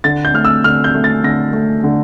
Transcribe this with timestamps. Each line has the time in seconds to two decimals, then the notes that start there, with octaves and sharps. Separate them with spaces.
0.04 D3 A6
0.25 G6
0.33 A3 F6
0.45 E6
0.64 D3 F6
0.84 G6
0.94 A3
1.04 A6
1.24 D3 A#6
1.53 A3
1.84 D3